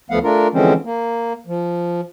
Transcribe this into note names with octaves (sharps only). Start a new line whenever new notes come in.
D2 F3 A3 B3 F5 F#5
A3 D4 F4 A#4
D3 E3 F3 G#3 C4 C#4
A#3
F3